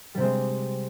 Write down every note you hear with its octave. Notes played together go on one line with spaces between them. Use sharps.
C3 G3 G#3 C4